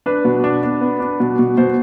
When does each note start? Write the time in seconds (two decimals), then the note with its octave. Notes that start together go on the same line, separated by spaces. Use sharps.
0.06 D4 B4
0.25 B2
0.44 D4
0.63 D4
0.81 B3
1.00 D4
1.20 B2
1.39 B2
1.57 B2 C5